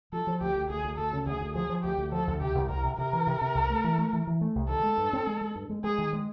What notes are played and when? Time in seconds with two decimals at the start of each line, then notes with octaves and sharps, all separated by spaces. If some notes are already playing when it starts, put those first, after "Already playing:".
0.12 F3 A4
0.27 F3
0.41 D2 G4
0.56 D2
0.70 D2 G#4
0.85 D2
0.98 D2 A4
1.13 C#3
1.26 D2 G#4
1.41 D2
1.55 F3 G#4
1.69 F3
1.83 D2 G4
1.98 D2
2.12 F3 A4
2.27 D2
2.41 C3 G4
2.55 C2
2.69 C2 A#4
2.84 C3
2.98 C3 A#4
3.13 E3
3.27 C3
3.41 C3
3.55 C2
3.70 A3
3.84 E3
3.98 A3
4.13 E3
4.27 E3
4.41 A3
4.55 C2
4.69 D#3 A4
4.83 G#3
4.98 G2
5.13 C4
5.27 G#3
5.41 G#3
5.56 G2
5.70 G#3
5.84 G#3 G#4
5.98 D#3
6.13 G#3